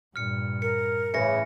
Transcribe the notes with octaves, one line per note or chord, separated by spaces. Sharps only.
G2 A#2 F6 C#7
A#4 C#7
A2 C#3 E3 A#6 C#7